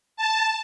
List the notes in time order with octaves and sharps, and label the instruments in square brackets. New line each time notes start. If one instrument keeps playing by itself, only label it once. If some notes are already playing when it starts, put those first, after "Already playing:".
[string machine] A5